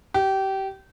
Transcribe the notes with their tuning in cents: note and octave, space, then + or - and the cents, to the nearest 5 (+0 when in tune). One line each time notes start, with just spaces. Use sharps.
G4 -25